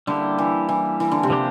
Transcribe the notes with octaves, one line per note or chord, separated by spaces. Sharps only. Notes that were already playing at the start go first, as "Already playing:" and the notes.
D3 G3 A#3 E4 G4
E3
E3
E3
D3
C3
F3 A#3 D4 G4 C5